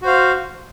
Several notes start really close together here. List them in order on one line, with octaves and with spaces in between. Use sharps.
F#4 C5 F5